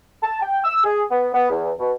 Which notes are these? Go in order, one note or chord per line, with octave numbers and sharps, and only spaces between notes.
A5
G5
E6
G#4
B3
B3
E2
B2